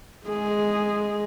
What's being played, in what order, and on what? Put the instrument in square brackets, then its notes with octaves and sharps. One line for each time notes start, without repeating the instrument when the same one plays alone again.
[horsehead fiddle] G#3 G#4